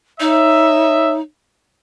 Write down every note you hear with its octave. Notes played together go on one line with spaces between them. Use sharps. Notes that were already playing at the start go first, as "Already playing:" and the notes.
D#4 C#5 D#5 E5